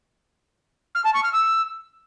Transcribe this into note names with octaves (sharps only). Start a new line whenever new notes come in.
F6
A5
C#6
F6
E6